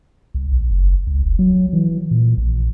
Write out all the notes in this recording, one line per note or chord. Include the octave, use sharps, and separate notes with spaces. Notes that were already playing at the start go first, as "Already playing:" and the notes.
C2
A#1
F#1
C#2
E1
F#3
E3
A#2
A#1